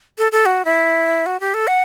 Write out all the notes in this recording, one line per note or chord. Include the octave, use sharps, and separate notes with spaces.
A4
A4
F#4
E4
F#4
G4
A4
F#5